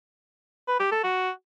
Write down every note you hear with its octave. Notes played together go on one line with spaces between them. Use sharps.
B4
G4
A4
F#4